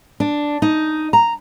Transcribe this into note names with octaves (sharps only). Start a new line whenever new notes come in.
D4
D#4
A#5